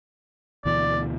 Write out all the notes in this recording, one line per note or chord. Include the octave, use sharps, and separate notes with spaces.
D2 B2 E3 D5